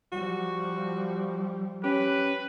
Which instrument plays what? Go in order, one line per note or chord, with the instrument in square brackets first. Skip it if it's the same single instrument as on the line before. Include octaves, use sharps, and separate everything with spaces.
[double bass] F3 G3 [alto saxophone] F#4
[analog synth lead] C#4 [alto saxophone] G4 [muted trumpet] B4